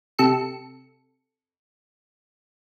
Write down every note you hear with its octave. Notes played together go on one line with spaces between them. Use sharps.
C3 A4 C#7